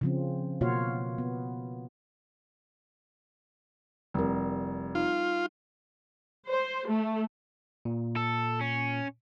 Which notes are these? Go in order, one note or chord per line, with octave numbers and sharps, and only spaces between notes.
C#3 F3 C4
B2 A#3 F4 F#4 C#5 F5
B3
F1 G3 E4 A#4
D#4 F4
C5
A3
A#2
A4
C#4